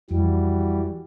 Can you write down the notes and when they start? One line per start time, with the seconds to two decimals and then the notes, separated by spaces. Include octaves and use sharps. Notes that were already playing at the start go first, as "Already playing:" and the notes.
0.11 F2 E3 G3 F#4 G4